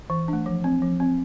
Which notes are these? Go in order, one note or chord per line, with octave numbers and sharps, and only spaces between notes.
E3
A3 D4
F3
C4
F3
C4